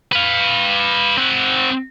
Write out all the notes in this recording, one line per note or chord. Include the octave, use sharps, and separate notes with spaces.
B4 F5
C4 F#5